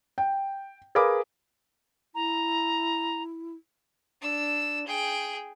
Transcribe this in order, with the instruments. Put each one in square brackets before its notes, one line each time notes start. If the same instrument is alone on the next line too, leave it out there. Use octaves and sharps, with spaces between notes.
[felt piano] G5
G#4 A#4 B4 F5 B5 D6
[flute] E4 [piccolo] A#5
[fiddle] D4 E6
G#4 G5